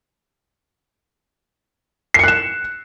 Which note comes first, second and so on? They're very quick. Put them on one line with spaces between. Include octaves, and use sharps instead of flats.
C7 C#7 F#6 E7